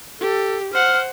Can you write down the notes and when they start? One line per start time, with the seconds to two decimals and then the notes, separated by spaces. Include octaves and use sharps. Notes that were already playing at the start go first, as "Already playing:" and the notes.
0.20 G4 A4
0.74 C5 F#5 F6